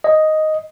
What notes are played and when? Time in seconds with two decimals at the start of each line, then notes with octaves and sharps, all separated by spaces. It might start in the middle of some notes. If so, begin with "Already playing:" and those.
0.04 D#5